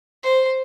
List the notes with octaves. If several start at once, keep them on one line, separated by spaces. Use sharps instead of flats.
C5